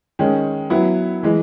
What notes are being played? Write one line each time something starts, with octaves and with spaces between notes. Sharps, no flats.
D#3 G#3 C#4
F#3 B3 E4
E3 G#3